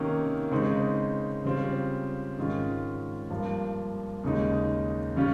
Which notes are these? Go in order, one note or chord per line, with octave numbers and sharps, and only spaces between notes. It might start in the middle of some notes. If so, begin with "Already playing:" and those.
Already playing: C3 D#3 A#3 C#4
C#3 G#3 C4 D#4
C#3 G3 C4 F4
G#2 D#3 G#3 C#4 F4
G2 F3 A#3
D#2 C#3 G#3 D#4
C#3 G3 C#4 F4